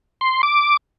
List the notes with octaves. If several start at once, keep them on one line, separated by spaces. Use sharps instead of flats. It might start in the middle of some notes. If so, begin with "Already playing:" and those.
C6
D6